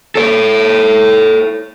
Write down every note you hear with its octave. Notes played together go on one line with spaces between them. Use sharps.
A4 C#5